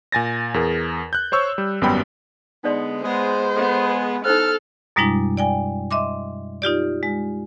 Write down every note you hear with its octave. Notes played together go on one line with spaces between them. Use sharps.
A#2 G#5 A6 A#6
E2 G#4 A#4
F#6 G6
C5 C#5 C#6 E6
G3
G#1 F#2 G3 B3 G5 B5
D3 G#3 B3 D#4 D5 C6
G#3 B3 G#4 C5
B3 A4
D#4 E4 A4 C5 F6
F#2 B2 G3 G#3 D4 E4
D5 G5 G#5
D#5 E5 C6 D6
D#4 F4 G4 D5
G#3